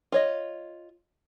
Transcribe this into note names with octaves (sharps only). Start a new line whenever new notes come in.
F4 C#5 D#5